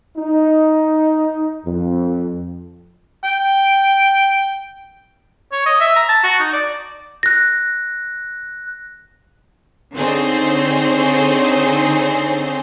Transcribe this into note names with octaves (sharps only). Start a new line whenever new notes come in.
D#4
F2
G5
C#5
D#5
E5
A#5
A5
F#4
D#4
D5
F#6 A#6
D3 C4 D#4 G#4 C5 C#5